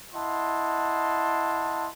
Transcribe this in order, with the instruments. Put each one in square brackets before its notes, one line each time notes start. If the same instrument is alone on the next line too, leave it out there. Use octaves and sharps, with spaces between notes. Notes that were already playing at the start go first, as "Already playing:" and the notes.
[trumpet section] E4 D#5 F#5 A5 C6